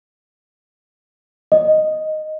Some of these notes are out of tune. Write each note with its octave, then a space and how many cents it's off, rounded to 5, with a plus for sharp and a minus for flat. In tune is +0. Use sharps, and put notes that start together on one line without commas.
D#5 +0